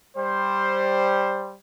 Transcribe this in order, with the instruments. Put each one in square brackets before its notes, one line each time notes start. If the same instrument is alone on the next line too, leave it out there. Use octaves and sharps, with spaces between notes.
[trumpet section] G3 C5